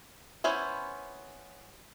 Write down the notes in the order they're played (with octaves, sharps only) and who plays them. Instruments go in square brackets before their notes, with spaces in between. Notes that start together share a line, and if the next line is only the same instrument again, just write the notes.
[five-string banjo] B3 C#4 E4 C5